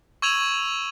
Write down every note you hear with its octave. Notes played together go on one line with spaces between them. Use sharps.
C#6 E6 G#6 D#7 F7 F#7